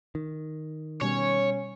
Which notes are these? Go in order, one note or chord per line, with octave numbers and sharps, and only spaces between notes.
D#3
B2 G3 C#4 C#5